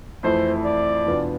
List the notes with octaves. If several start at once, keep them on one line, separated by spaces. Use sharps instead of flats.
F2 E3 A3 E4 C5
D5
E2 B2 B3 D4 F4